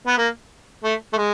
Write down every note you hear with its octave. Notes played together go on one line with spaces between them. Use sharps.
B3
A#3
A3
A3
G#3